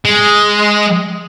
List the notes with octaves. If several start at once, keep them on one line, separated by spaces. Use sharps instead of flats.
G#3